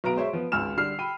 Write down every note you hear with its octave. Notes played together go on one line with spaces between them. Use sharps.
B1 B3 A#5 D7
G#3 C5 C#5 E5
F3 B3
G#1 C#2 G#5 E6 F6 E7
D3 G3 F6 C7
G5 B5 D#7